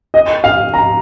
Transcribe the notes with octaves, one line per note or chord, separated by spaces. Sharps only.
D#5
F5
A#5